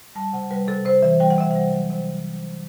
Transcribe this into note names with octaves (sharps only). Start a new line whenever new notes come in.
G3 A5
C3 F#5
G3 B4
C3 A4
C3 C5
E3 E5
G3 G5
F#5
C3 E5
G3 F#5
F#3
C3